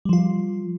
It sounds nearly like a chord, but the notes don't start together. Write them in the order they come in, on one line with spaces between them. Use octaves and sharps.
G3 F3 F4